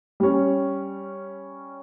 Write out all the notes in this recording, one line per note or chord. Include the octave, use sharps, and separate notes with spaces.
G3 C#4